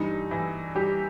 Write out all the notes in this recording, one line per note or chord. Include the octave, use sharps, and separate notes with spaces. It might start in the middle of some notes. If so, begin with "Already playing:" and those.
Already playing: G2 E3 G3 D#4
E3 E4
G3 G4